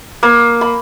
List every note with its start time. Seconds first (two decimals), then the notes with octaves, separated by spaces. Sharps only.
0.23 A#3
0.61 B5